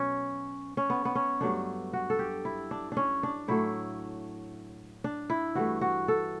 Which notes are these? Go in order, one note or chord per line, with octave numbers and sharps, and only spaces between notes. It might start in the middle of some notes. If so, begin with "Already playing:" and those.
Already playing: B2 F#3 C#4
C#4
B3
B3
C#4
G2 F#3 A3 D4
F#4
A4
G4
E4
D4
C#4 D4
D4
A2 F#3 A3 E4
D4
E4
G2 E3 A3 F#4
F#4
A4